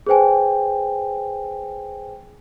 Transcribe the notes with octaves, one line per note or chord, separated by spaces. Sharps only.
G#4 B4 C5 G5 G#5